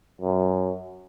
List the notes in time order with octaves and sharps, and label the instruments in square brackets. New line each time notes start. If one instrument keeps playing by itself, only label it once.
[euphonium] F#2